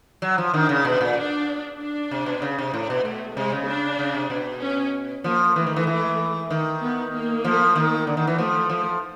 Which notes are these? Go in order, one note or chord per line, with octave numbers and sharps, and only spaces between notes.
F#3
F3
D#3 D4
C#3
B2
A#2
D4
D4
C3
B2
C#3
C3
A2
B2
B2 A3
C3 G#3
C#3
D4
C#3
C3
B2
C#4
F3 A#3
E3 A3
D#3
E3
E3
D#3
B3
A#3
F3
D#3
D3
D#3
E3
F3 A3
F3